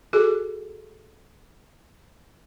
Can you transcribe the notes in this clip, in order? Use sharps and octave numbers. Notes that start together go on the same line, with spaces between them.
F#4 G#4 A4